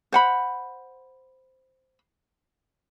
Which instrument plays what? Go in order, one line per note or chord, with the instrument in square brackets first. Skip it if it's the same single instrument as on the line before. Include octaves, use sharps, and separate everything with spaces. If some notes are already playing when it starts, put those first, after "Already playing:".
[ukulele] C5 F#5 B5